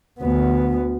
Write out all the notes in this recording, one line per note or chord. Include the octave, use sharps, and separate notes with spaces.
D2 B3